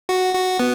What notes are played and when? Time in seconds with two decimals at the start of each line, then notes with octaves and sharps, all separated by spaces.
0.09 F#4
0.35 F#4
0.60 B3